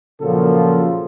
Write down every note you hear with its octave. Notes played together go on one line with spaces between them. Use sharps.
A#2 C#3 F3 F#3 A#3 A4